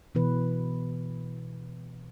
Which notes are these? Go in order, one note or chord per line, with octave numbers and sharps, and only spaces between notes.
B2 E3 B4